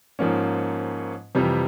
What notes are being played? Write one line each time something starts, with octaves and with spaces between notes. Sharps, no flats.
G#2 F3 A#3 C#4
F2 C3 E3 G3